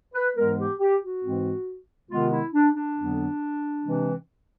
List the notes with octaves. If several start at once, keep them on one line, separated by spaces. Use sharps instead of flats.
B4
G#2 E3 G#3 B3 A#4
G4
G4
F#4
G#2 E3 G#3 C4
C3 D#3 G#3 B3 F4
E4
D4
D4
F2 D3 F#3 B3
C3 E3 G#3 C4